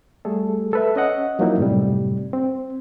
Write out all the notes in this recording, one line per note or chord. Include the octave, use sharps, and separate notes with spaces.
G3 A3 G#4 A4
A4 B4 E5
C#4 D#5 F#5
F3 F#3 A#3 D#4 E4
F#2 A2 C3 G3
C4